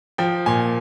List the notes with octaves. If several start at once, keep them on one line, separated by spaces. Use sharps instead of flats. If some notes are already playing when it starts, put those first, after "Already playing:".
F3 G5
A#2 G#5